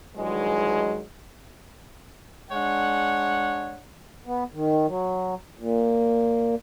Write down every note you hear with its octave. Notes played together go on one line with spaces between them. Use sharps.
G2 D#3 E3 F#3 G#3
G#3 D4 C#5 F#5
B3
D#3
F#3
A#2